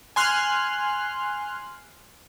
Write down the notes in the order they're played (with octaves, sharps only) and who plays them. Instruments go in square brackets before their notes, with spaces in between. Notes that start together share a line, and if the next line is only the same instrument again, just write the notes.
[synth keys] G#5 C6 F6 F#6